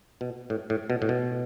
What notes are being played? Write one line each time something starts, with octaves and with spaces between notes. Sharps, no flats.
B2
A2
A2
B2
A2
B2